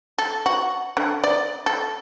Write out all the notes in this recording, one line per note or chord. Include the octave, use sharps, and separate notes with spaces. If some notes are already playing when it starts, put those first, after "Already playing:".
A4
F#4
D3
D5
A4